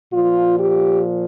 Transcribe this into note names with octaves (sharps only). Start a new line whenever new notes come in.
A#2 F3 F4
G4